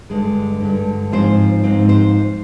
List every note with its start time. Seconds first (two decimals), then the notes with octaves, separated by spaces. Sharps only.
0.10 G2 D3 G#3
0.61 G2 D3 G#3
1.12 G#2 F3 C4 C5
1.63 G#2 F3 C4
1.89 C5